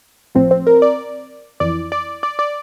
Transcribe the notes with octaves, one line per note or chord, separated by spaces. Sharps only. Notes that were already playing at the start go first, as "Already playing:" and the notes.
A1 A2 F3 C4
C4
A#4
D5
F2 E3 D5
D5
D5
D5